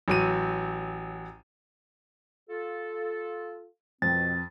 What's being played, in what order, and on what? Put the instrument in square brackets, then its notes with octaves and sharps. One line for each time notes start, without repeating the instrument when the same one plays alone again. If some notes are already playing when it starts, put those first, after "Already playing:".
[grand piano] A1 F#3 D#7
[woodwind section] F4 A4
[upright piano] F2 [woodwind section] B2 C4 [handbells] A6